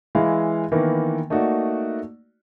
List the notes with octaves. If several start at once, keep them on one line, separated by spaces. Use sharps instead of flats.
E3 G#3 E4 F5
D#3 E3 A#3 B3
A3 A#3 D#4 F#4 D5